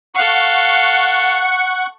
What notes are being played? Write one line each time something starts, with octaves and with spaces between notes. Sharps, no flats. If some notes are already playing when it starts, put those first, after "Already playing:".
A4 F5 F#5 C#6